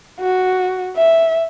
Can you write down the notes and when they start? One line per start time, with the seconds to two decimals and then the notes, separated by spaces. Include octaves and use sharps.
0.20 F#4
0.96 E5